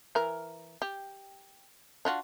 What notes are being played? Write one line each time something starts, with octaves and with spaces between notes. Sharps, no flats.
E3 A#4
G4
D4 F4 F#4